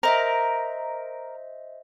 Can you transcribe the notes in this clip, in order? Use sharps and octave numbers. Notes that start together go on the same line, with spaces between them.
A#4 C5 D#5 E5